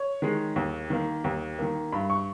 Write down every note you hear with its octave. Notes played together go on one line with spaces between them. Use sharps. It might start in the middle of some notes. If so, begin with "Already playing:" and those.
Already playing: C#5
D#3 G#3
D#2
D#3 A#3
D#2
D#3 A#3
G2 B5
C#6